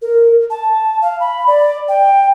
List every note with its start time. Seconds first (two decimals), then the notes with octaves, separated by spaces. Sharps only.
0.02 A#4
0.50 A5
1.02 F5
1.20 B5
1.47 D5
1.88 G5